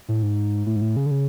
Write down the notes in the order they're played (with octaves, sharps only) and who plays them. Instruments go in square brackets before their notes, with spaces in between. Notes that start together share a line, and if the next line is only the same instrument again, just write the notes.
[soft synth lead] A2
G#2
A2
G#2
A2
C#3
D3
C#3